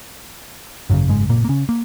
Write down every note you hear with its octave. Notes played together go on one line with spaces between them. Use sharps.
G#1 F#2 C#3 F#3
G#2 G#3
A#2 A#3
A#3
C#3 C#4
A#3